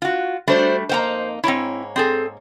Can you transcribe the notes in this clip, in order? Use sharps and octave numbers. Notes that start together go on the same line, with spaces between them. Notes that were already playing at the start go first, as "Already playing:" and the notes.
F4 F#4
G3 A3 D4 F#4 C5 D5
F2 A#3 D#4 C5 F#5 A#5
G#2 A#3 C4 E4 C#5
C4 G#4 A4